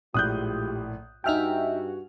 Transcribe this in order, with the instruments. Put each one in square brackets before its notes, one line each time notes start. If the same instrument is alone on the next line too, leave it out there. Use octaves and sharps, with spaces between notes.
[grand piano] A#1 A2 [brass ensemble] G#3 F4 G4 [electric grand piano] D#6 F#6 G6
[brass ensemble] G2 F#4 [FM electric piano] D#4 E5 G5 [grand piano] G#5 F6 F7